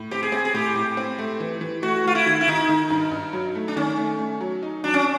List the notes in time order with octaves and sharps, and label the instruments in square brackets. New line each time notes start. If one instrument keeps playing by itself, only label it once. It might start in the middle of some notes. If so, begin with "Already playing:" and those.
Already playing: [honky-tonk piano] A2
[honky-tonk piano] C4 [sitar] G4
[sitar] G#4
[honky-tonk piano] C4
[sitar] G#4
[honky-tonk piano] A2 [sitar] G4
[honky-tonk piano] A2
C4
A3
E3
E3
[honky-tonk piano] A3 [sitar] F#4
[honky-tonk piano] A3 [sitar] F4
[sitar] E4
[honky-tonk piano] D#3
[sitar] E4
[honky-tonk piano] D#3 [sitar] D#4
[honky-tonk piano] D#3
G2
G2
F#3
A3
[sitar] D4
[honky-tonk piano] D#3 [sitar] C#4
[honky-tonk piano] A3
A3
F#3
D#4
[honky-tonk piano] F#3 [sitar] D4
[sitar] C#4